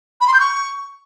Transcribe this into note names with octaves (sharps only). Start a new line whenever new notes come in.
B5
C6
G6
C#6